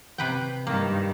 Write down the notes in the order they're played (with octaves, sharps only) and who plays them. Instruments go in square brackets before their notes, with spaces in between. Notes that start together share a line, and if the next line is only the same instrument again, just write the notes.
[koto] C3 B4 G5
[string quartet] G2 D#3 [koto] A#3